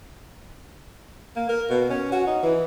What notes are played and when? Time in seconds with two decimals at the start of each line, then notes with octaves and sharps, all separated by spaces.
1.36 A#3
1.49 A#4
1.69 B2
1.90 C#4
2.12 F#4
2.27 D#4
2.42 E3